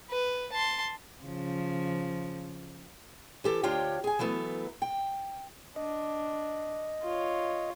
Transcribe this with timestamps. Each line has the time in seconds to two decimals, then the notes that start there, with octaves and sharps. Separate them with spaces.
0.10 B4
0.52 A5 C6
1.24 C#3 F3
3.44 E3 G4 A4
3.63 D2 D4 F4 G4 C#5 G5
4.04 G#4 G#5
4.19 E3 F#3 A3 B3
4.82 G5
5.76 D4 D#5
7.03 F4 C#5